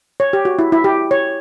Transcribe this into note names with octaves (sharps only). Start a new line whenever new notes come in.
C#5
G4
F#4
E4
E4
G4
C#5